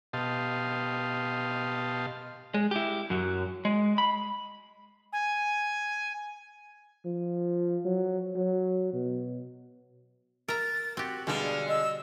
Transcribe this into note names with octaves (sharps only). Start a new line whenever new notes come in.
B2 G4 D#5 F5 A5 C6
G#3
E4 G4
F#2 F#3
G#3
B5
G#5
F3
F#3
F#3
B2
A#4 E5 A#5 A6
C4 F#4 G4
B2 D3 G3 G#3 F5
D#5 E6